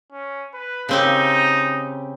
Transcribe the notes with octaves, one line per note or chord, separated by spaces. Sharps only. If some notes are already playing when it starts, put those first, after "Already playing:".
C#4
B4
C#3 C4 D#4 G4